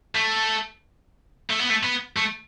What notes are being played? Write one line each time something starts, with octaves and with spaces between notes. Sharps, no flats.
A3
A3
B3
A3
B3
A3